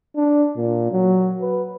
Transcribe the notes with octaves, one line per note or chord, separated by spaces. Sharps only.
D4
A#2
F#3
B4